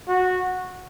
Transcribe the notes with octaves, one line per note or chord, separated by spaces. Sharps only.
F#4